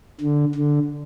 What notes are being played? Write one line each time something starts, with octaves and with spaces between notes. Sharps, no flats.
D3
D3